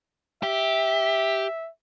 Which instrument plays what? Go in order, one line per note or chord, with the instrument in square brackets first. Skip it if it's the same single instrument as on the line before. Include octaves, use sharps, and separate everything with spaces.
[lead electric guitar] G4 [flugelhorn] E5